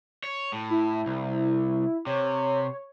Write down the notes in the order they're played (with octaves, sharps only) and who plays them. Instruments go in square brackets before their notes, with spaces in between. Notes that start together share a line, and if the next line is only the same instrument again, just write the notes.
[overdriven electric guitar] C#5
A2
[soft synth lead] E4
[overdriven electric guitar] C2
[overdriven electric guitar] C3 [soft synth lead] C#5